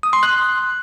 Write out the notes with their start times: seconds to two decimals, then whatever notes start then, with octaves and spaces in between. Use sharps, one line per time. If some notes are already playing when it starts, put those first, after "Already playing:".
0.03 D#6
0.13 C6
0.23 F#6